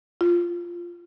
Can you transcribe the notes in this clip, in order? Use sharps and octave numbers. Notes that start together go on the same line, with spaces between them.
F4